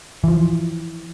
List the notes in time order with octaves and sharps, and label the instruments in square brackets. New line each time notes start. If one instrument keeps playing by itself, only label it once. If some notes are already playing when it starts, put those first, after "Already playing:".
[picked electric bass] E3 F3